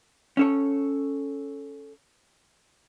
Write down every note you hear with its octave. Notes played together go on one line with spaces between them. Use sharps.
C#4 A4 C#5